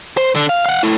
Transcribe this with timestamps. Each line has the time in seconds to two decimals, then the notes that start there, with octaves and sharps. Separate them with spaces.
0.17 C5
0.36 D3
0.49 F5
0.66 F5 F#5
0.83 A3 E4